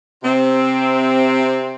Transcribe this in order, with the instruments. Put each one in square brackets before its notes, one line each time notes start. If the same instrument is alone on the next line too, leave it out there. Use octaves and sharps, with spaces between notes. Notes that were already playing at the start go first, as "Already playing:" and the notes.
[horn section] C3 C4